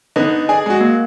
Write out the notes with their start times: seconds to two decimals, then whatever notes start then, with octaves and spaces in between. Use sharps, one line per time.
0.16 D3 B3 D#4 D#5
0.49 G#4 D5 G#5
0.66 G#3 F#4
0.81 A#3